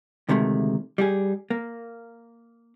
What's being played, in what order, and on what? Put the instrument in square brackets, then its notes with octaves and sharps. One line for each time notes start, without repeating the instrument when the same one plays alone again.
[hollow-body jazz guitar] D2 C3 D#3 G#3 A3
G3 G4 G#4
A#3